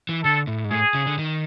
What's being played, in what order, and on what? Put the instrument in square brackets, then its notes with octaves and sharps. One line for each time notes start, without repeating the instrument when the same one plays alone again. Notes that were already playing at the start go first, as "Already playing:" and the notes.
[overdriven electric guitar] E3
[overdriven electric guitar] D3 [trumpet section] A4
[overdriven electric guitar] A2
G#2
[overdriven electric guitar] A2 [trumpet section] G#4
[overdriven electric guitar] C#3
D3
D#3